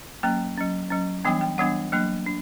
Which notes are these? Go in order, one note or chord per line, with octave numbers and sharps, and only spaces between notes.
F#3 A#3 C#4 G5
F#3 C#4
F#3 C#4
E3 G3 B3 D4 G5
G5
E3 G3 B3 D4 F#5
F#3 A#3 D4
D4